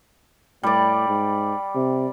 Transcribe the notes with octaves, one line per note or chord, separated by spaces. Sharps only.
A2 G3 D5
G#2
C3